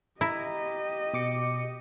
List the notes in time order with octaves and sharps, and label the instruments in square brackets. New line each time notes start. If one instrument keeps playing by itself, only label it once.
[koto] E4 [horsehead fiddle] G4 D#5 [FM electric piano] A#5
[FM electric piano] B2 D6 C#7